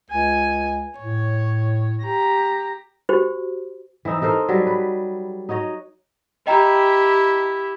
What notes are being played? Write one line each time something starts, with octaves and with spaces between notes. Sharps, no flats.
C#2 G#5
A2 C#5
G4 A#5
F#4 G4 C5
E3 C4 D#4 E5
D#4 A4 A#4 C5
F#3 G3 A4
B4
D#4 F#4 C#5 D#5
E4 G4 D#5 G5 A#5